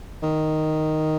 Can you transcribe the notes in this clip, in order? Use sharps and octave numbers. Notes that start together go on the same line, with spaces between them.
D#3